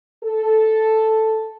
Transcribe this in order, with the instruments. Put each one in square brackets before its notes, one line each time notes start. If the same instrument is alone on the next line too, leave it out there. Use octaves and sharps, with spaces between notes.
[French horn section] A4